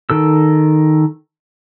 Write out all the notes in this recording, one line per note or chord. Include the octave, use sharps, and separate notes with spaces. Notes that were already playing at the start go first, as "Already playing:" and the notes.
D#3 A4 E6